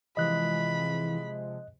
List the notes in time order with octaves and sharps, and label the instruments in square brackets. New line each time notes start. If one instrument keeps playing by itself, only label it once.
[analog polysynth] C3 F3 G#3 [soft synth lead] E3 [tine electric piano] D#5 F#6 [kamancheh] B5